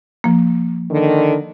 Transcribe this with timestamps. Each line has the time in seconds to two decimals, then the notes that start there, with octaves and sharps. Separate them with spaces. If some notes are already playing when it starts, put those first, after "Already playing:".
0.24 F3 A#3
0.91 D3 D#3